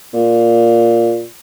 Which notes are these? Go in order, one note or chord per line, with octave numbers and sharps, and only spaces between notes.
A#2